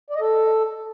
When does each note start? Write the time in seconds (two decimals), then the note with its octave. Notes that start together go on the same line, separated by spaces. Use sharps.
0.10 D5
0.15 D#5
0.21 A4